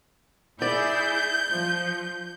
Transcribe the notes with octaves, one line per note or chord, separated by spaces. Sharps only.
E4 G#4 D5 G6
F3